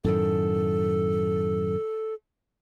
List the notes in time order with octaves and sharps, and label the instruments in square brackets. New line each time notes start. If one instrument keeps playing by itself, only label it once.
[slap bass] F#2 A2 D#3 [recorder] A4